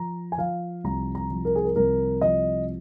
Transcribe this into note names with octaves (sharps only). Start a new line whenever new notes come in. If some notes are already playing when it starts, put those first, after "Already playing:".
Already playing: F3 A#5
G#5
F3 F5
C2 A#5
A#5
F3
A#4
G#4
A#4
C2 A#4
F3 D#5